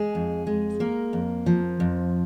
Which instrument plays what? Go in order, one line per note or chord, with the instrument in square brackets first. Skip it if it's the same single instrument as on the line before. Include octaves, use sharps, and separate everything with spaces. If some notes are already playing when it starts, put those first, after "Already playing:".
Already playing: [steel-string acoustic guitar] G#3 G#4
F2
G#3
A#3 A#4
F2
F3
F2